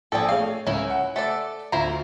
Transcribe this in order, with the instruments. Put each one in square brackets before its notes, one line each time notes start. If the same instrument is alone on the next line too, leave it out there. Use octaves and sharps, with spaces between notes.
[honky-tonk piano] A#1 D5 G5 [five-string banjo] G#4 A4
[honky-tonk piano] A3 G#4 C#5 [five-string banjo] F5
[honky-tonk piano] C#2 [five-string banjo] C#4 E4 A#4
[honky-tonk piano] F#5
[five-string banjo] A3 A4 D5
[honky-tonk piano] D2 F4 [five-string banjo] E4 C5 A#5